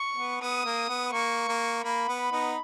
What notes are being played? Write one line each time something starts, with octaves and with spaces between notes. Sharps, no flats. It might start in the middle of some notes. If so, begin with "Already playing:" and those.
Already playing: C#6
B3
B3 D#6
A#3
B3
A#3 C#6
A#3
A#3 B5
B3
B5
B3 D#4